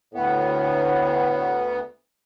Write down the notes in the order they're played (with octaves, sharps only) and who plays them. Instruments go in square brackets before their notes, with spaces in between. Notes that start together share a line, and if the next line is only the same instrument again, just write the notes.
[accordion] D2 B3 [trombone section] A2